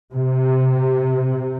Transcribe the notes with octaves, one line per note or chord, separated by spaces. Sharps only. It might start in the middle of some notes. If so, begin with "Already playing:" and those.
C3